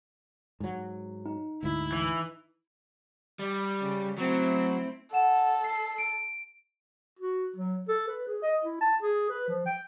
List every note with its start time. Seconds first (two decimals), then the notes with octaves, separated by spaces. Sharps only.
0.60 G#2 F#3
1.26 D#4
1.63 D2 G#2 E4
1.92 E3
3.39 G3
3.81 C#3
4.18 F#3 A3 C4 E4
5.13 A4 F#5 E7
5.64 C7
5.98 D7
7.19 F#4
7.56 F#3
7.88 A4
8.08 B4
8.27 G#4
8.43 D#5
8.63 E4
8.81 A5
9.02 G#4
9.29 B4
9.48 F3
9.66 G5